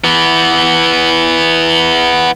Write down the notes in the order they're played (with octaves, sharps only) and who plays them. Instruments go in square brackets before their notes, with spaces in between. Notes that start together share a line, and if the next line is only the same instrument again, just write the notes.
[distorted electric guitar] E3 B3